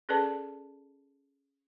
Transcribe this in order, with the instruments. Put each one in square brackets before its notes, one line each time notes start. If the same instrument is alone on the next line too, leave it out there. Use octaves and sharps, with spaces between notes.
[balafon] C#4 G#4 A4 B4 D5 A5